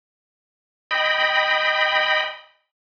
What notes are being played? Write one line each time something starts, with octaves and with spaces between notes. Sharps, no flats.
D#5 G5 B5